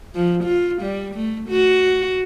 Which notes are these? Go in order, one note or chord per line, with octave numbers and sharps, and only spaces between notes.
F3
F4
G3
A3
F#4